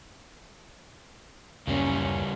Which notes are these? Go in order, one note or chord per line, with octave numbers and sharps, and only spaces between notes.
D1 F#2 C#3 G3 A#3 C#4